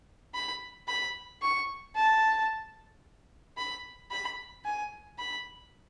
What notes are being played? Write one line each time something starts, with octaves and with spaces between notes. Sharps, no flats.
B5
B5
C#6
A5
B5
B5
G#5
B5